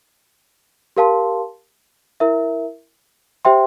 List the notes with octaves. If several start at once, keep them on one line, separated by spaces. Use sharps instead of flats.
G4 A#4 F5 A5 C6
E4 A#4 E5
G4 C5 E5 G5 C6